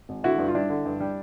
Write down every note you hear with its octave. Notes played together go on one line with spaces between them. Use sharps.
G#1
D3 E4 F#4
G2
F4
G3 D4 E4
D3
G2
G3